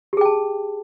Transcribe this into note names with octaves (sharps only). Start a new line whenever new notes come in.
G4 G#4 G5 A5